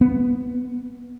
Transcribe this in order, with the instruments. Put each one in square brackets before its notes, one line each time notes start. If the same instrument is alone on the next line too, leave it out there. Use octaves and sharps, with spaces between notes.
[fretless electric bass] B3